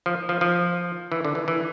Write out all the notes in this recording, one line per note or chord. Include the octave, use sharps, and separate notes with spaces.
F3
F3
F3
E3
D3
E3
E3